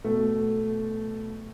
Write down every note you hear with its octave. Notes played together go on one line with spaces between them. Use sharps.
B2 A3